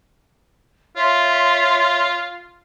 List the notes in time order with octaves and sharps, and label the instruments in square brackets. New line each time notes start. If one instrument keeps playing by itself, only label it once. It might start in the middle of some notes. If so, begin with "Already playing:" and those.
[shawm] F4 [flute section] C#5 E5 C6